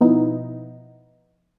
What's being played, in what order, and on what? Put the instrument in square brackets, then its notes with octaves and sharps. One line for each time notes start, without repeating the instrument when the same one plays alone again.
[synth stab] B2 F3 B3 D#4 E4